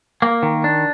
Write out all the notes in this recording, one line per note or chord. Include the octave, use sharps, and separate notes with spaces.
A#3
D#3
D4